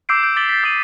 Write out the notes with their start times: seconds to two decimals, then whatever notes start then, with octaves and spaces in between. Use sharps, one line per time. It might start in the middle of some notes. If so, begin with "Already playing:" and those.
0.09 D6 E6 G6 C7 D7
0.23 G6 D7
0.36 D6 A6 B6 F#7 G7
0.49 A6 B6
0.64 D#6 G6 A6 D#7 F#7